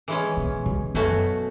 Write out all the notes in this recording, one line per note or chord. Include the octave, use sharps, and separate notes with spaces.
E3 G#3 C#4
B2
C#3
F#2 B2 A3 C#4 F#4